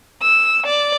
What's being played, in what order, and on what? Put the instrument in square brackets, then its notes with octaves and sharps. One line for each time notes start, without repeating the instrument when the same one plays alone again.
[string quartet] E6
D5